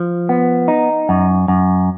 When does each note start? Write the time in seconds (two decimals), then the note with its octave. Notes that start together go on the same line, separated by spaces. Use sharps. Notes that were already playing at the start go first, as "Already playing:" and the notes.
Already playing: F3
0.29 B3
0.68 D#4
1.09 F#2
1.48 F#2